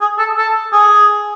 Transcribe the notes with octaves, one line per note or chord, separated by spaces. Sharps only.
G#4
A4
A4
G#4